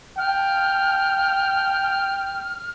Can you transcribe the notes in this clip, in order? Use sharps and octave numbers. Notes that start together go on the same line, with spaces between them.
G5 F6